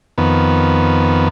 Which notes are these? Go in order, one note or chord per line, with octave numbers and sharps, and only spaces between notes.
F2 D#3 B3